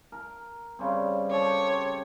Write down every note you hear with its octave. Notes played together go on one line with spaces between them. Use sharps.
A#4
C#3 G3 C4
G4 A4 C#5